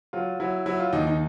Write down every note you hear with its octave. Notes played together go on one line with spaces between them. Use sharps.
F#3 F4
F#3 E4
F#3 E4
F4
D#2 D#4
D#4